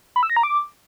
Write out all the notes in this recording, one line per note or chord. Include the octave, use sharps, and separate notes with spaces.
B5
E6
A#6
A#5
D6